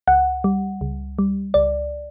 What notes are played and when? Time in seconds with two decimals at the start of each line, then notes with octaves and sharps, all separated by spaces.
0.08 C#2 F#5
0.44 G3
0.81 C#2
1.19 G3
1.54 C#2 D5